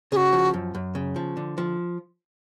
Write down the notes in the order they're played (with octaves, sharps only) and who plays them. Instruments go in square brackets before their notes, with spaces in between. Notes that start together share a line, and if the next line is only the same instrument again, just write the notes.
[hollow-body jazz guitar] C#3 [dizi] G#4
[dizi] F#4
[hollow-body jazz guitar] F3
F#2
F#2
C#3
F3
D3
F3